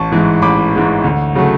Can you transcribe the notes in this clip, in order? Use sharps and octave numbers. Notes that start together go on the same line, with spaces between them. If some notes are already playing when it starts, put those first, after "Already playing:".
Already playing: A1 A5 C#6
G#2 E3 G#3
A1 B5 D6
G#2 E3 G#3
D2
C#3 F#3 A3